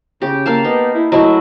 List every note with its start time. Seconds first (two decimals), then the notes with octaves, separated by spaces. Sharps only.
0.22 C#3 G4
0.46 A#3 F5 A5
0.64 B3 D#4
0.94 E4
1.12 F#3 A3 E4 D#5